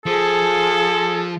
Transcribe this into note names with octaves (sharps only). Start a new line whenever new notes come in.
F3 G#4 A4